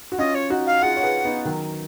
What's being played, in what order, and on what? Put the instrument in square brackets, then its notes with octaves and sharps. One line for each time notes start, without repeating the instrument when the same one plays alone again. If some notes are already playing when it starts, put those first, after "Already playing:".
[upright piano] F#4
[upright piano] C#4 F4 [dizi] D#5
[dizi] C#5
[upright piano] D#4 F#4
[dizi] F5
[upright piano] F4 G#4 [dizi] F#5
[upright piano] C#5
G#4 B4
B3 D#4
D#3 F#3